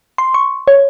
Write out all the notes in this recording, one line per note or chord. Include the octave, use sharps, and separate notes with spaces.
C6
C#6
C#5